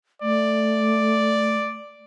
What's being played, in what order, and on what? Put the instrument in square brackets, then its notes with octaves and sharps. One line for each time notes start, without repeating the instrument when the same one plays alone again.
[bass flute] A3 [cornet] D5